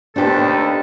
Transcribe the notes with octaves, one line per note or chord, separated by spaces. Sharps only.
D#2 A3 B3 D4 G4 A4 C5